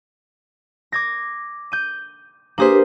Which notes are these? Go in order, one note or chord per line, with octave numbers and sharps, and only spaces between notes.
D6 G#6 A#6
G6 D#7
A#3 D4 G4 G#4 B4 C5